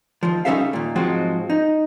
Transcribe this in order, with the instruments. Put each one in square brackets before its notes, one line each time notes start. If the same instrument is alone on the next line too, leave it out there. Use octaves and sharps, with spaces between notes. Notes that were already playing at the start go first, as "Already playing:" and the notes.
[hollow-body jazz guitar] D#2 F3
G3 C#4 D#4 A4 E5 F5
D#2 A#2
G#2 F3 F#3 G#3 C4 F#4
D#4